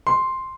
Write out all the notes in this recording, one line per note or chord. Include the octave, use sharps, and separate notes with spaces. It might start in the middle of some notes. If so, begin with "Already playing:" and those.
C6